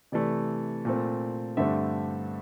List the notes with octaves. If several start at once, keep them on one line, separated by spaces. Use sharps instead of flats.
C3 E3 A3 D5
A#2 A3 C4
G2 D3 A3 C4 E5